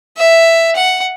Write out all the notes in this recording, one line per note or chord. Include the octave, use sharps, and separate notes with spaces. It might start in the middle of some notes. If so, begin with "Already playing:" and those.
E5
F#5